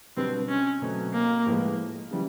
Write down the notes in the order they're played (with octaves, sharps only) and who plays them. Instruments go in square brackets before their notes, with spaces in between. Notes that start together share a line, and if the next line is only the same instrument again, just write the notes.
[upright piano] B2 G3 B3 D4 [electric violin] C4
[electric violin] C#4
[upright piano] B2 F#3 A3 C4
[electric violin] A#3
[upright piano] A2 F3 G#3 B3
C#3 E3 G3